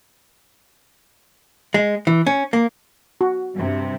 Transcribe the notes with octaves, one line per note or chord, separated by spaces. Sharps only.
G#3
E3
C#4
A#3
F#4
G2 C3